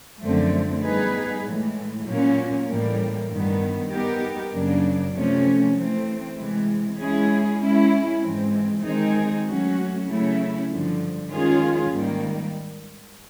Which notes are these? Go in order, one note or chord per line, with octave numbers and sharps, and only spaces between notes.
F#2 D3 F3 A3 C4
G3 B3 D#4 G#4 B4
A2 E3 G#3
A#2 F#3 A#3 C#4
A2 E3 G3 A#3
G2 D#3 G3 B3
G3 B3 D#4 G4 A#4
F#2 C#3 F#3 A#3 D4
C3 F3 A3 C#4
E3 A3 C4
C3 E3 G#3
G#3 C#4 E4 G#4
G#3 C#4 E4
G#2 E3 G#3 C4
D#3 G#3 C4 D#4 G#4
F#3 A3 C#4 F#4
C#3 F#3 A3 C#4 E4
G2 D3 F3
D#3 G#3 C#4 F4 G#4
G#2 D#3 G3 A#3